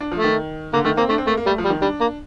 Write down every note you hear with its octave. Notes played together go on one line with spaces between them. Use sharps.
D4
F3
A3
D#3
D3 A#3
D#3 A3
A#3 C4
A3 D4
C4
A3 A#3
A#3
G3 A3
F3
G3
D#3
G3 D4
A#3